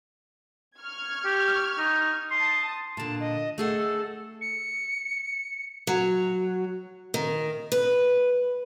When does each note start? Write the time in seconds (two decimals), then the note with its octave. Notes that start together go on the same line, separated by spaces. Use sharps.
0.78 C#6 F6 G#6
1.25 G4
1.78 D#4
2.31 A5 C6 D#6
2.97 A#2 D3 A5
3.20 D#5
3.58 A3 G#4 A4 F#5
4.41 C#7
5.87 F#3
7.14 D#3
7.72 B4